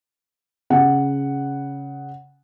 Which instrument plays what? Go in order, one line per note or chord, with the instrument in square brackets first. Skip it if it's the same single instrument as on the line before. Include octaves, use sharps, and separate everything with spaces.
[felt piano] C#3 F#5